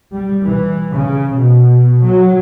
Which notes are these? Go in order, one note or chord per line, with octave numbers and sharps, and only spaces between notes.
G3
E3
C#3
B2
F#3